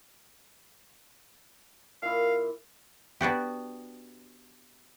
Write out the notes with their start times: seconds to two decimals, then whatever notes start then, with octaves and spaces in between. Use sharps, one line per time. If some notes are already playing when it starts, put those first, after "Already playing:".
2.02 A#2 E4 F5
3.21 B3 D4 F#4 G4